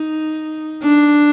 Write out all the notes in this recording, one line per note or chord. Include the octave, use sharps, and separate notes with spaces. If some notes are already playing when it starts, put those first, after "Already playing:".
Already playing: D#4
D4